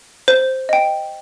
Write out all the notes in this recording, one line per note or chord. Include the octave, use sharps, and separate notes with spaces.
C5
D#5 G5